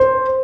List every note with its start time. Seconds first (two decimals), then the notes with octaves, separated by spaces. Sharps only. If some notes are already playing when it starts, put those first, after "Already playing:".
Already playing: C5